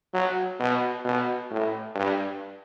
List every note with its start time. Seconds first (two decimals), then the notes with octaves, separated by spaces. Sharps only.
0.14 F#3
0.60 B2
1.05 B2
1.51 A2
1.95 G2